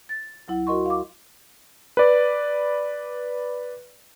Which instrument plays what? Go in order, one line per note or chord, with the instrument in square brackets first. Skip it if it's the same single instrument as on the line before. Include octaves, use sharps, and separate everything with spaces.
[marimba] A6
D2 F#3 E4 F#5
F#4 A#4 D#5 C6 C#6
F5 D6
[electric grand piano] B4 D5